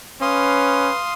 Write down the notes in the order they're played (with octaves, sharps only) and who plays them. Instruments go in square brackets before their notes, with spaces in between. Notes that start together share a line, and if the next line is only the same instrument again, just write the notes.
[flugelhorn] C#4 [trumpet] B4 [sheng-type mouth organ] F5 C6 D#6